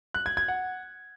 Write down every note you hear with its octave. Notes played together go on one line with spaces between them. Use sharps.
F#6
G#6
G#6
F#5